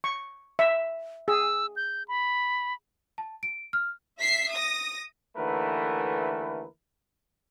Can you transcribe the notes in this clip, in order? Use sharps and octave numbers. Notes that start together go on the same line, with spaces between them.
C#6
E5
G#4 E6
G6
B5
A5
D7
F6
E5 B6 C7
D#6 A#6
D#2 D3 E3 A3 A#4 B4